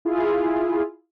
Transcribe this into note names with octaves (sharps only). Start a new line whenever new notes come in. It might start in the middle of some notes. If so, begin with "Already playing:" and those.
E4 F4 G#4